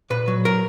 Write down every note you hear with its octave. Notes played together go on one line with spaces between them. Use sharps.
A#2 B4
F#3
A#4